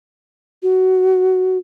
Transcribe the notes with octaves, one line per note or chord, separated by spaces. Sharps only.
F#4